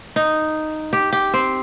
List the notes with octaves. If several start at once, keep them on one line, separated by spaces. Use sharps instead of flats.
D#4
G4
G4
C4